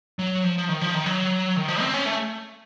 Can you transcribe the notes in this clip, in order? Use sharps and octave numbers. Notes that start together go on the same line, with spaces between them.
F#3
F3
F3
D#3
F3
D#3
F#3
D#3
F3
C4
C#4
A3